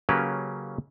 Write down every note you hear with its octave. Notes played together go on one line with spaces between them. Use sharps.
C#3 F#3 A#3 C#4 G4 B4